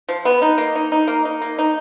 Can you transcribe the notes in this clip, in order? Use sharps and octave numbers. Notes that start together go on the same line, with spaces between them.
F3
B3
D#4
A#3
D#4
D#4
A#3
D#4
A#3
D#4